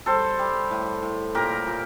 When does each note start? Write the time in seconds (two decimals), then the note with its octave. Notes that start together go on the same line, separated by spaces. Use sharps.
0.06 G3 A4 C5
0.39 G3
0.71 A2
1.02 A2
1.35 A#2 G4 A#4
1.67 A#2